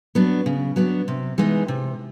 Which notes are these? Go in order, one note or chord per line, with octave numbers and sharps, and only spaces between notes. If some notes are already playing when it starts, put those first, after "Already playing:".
F#3 B3 D4
C#3
F#3 B3 D4
C3
E3 G#3 B3 D#4
C3